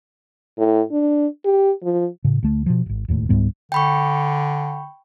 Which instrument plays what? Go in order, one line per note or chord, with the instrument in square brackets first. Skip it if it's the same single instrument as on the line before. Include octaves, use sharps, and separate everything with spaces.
[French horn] A2
D4
G4
F3
[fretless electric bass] A2 C#3
D2 A3
B2 F3
D1 G#1
E1 D#2 A2
C#2 G#2 G3 B3
[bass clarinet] D3 [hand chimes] G5 B5 C#6